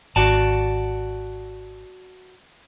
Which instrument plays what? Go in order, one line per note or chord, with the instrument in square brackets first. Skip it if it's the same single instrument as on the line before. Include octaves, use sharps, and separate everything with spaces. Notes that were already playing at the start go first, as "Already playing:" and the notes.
[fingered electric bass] G#1 [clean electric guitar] F#4 D5 A5